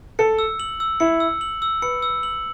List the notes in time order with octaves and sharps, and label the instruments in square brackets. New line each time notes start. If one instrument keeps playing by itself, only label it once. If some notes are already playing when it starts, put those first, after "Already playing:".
[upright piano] A4 [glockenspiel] C#7
[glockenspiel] E6
F#7
E6
[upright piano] E4 [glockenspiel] C#7
[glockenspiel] E6
F#7
E6
[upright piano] B4 [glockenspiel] C#7
[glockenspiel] E6
F#7